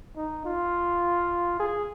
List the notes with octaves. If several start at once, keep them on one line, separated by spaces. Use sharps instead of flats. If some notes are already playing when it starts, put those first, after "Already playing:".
D#4
F4
G#4